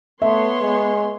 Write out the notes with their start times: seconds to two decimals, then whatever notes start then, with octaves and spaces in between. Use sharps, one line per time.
0.22 A3 B3 C#5 E5 C6
0.61 G#3